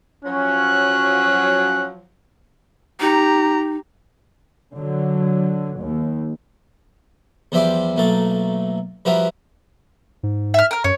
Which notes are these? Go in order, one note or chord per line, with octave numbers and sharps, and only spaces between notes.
F3 F#3 C#4 F#6
D#4 G4 A#5
D3 F#3
D#2
E2 F3 G3 E5 C6 D6
B1 A3 A#3 A5
F3 G3 E4 F#4 A#4 B4
G#2
E5 F6
A#4 F6
F#2 C#5